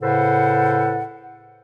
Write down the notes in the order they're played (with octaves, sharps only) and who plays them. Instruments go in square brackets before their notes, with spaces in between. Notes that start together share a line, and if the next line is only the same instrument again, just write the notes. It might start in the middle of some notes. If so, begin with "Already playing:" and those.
[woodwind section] A2 C#3 A4 B4 C5 F#5